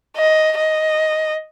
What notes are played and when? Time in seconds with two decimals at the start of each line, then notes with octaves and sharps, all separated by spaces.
0.17 D#5
0.58 D#5